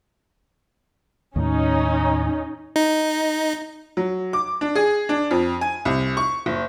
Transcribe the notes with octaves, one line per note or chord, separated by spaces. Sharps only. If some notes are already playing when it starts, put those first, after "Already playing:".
D#2 A2 C#4 D#4
D#4
F#3
D6
D4
G#4
D4
F2
G#5
C2
C#6
F#1